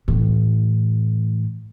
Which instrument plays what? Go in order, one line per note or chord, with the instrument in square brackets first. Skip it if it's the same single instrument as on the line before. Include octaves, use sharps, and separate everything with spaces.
[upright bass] A2 E3